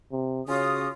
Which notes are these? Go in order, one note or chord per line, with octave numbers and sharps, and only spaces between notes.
C3
C#3 C#4 F4 F#4 D#6